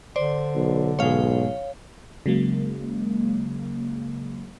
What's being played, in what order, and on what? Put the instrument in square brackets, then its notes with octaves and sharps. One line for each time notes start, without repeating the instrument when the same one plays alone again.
[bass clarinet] D3 [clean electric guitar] C5 [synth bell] D5
[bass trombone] B1
[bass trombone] B1 [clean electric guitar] G#2 B2 G#4 [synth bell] C#5 F5
[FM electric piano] C#3 F#3 G#3 A#3